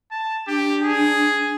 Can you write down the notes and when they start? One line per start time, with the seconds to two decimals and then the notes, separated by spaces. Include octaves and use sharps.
0.11 A5
0.47 D4 G4
0.83 G#4